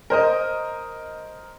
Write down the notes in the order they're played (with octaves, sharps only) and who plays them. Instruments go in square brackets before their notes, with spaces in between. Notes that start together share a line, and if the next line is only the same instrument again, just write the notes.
[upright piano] A#4 C5 D#5